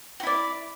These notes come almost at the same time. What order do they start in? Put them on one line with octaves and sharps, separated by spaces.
F#4 E4 D5